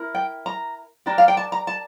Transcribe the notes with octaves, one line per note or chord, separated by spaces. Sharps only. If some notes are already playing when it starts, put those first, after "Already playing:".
Already playing: E4 A#4
G5
A#5
D4 G4 A#4
F5
G5
A5
A#5
A5